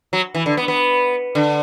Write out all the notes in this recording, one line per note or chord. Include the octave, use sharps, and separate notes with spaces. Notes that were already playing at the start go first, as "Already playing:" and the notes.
F#3
E3
D3
B3
B3
D3